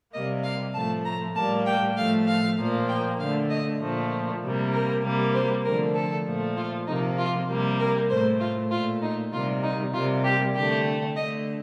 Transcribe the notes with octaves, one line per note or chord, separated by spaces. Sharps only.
C3 G3 A#3 D#5
F5
A2 F3 A3 A5
A#5
A2 G3 A#3 A5
G5
A2 F3 A3 F5
F5
A#2 F3 A#3
G5
D3 A3 F5
D#5
A#2 F3 A3
C3 G3 A#3
A#4
C3 G3 A#3
C5
D3 F3 A3 A#4
A4
A#2 F3 A3
F4
C3 F3 A#3 D#4
F4
C3 G3 A#3
A#4
A2 A3 C5
F4
A#2 A3 F4
D#4
C3 D#3 G3 A#3 F4
D#4
C3 G3 A#3 F4
G4
D3 A3 G4
D3 A3 D#5